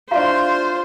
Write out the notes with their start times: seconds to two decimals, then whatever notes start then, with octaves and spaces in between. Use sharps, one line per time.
0.11 D4 E4 F4 G4 C5 F5 A#5